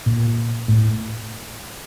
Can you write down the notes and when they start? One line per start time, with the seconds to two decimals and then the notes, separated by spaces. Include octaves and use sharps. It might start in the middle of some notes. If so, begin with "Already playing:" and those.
0.06 A#2
0.68 A2